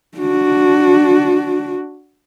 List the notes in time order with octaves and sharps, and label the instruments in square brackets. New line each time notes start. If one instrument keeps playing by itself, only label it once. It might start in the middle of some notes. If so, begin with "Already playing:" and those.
[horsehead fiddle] D4 F#4